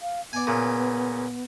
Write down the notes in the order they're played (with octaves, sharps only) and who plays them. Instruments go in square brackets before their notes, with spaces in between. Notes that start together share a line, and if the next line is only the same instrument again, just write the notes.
[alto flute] F5
[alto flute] B3 [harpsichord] D5 G#5
[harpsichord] A#2 C#3